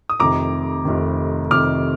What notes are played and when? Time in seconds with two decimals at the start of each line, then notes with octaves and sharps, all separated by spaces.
0.10 D#6
0.20 F1 F2 C3 D#3 A#5 D6
0.85 F1 F2 C3 D#3
1.51 F1 F2 C3 D#3 D6 F6